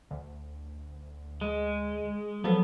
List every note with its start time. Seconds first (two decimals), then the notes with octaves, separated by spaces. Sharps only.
0.11 D2
1.41 G#3
2.44 F3 F#3 B3 A4